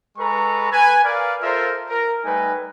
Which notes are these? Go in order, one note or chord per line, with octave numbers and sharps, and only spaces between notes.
G#3 A4 B4 A#5 C#6
B4 G#5
A#4 B4 D5 F5
F4 A4 A#4 C5 E5
A#4
G3 A3 D#4 B4 G#5